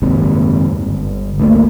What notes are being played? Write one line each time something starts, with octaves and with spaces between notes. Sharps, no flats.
F#1 D#2 G#2 C3
G1
G#1 D2 A3 A#3